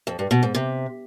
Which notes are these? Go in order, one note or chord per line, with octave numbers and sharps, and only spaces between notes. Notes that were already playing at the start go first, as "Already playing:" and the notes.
F2
G2
B2
G#2
C3